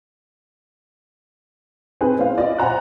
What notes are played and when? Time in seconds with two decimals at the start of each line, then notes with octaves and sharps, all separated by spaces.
2.01 C4 D#4 G#4 B4
2.19 B3 C#4 E4 C5 F5
2.37 F4 D5 D#5
2.58 C5 F#5 G#5 A#5 F#6